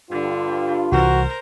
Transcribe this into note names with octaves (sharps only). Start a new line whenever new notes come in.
G2 D3 F4
C2 E3 F#4 A#4 C5